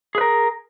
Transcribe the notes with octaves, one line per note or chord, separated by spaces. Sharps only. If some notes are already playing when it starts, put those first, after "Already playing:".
G#4 A#4 B4